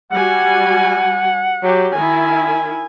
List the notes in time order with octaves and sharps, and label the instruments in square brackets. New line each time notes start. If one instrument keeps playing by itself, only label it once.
[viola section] G3 F#4 G#5 [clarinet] F#5
[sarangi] F#3 [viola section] G4
[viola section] D#3 E4 [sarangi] G#5